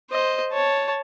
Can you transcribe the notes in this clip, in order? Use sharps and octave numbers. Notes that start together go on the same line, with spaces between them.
C5 D#5
C#5 A5